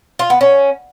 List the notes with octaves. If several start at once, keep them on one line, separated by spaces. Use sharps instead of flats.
F4
B3
C#4